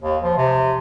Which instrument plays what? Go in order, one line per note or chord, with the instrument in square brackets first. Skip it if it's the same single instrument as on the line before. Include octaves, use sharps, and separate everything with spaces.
[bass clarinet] D#2
F3
C3